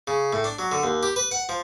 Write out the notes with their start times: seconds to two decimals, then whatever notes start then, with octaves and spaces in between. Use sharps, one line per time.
0.07 C#3
0.33 A2
0.44 D4
0.59 F#3
0.72 D3
0.83 D#2
1.03 G4
1.16 B4
1.31 F#5
1.49 F3